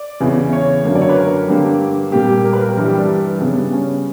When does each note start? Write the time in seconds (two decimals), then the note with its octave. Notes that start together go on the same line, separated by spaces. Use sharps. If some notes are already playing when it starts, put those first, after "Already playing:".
Already playing: D5
0.20 E2 C#3 E3
0.53 C#5
0.84 F#2 D3 A#3
0.95 D5
1.02 C#5
1.09 B4
1.17 A#4
1.48 G2 D3 A#3 G4
2.12 A#2 G3 A#3 G4
2.44 A#4
2.53 B4
2.61 A#4
2.69 G4
2.77 G2 E3 G3 A#4
2.88 G4
2.98 D4
3.41 C#3 G3 B3
3.73 C#4